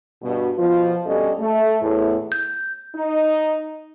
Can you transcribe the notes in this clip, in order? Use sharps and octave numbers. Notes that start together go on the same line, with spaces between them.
G2 B2
B2 F3 F4
G2 B2 G3 C#4 A4 D#5
A3
E2 A2
G6
D#4